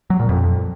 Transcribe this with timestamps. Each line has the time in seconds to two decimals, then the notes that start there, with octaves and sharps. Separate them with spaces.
0.10 F#3
0.20 A#2
0.29 F2